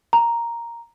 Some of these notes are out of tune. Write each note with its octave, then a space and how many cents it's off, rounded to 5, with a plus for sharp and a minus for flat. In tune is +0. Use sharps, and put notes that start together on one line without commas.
A#5 +0